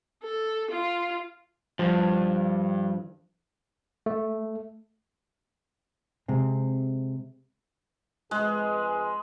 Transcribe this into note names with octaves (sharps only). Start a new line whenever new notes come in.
A4
F4
G2 F3
A3
C3 G#3 C4
F2 G#3 G#4 B4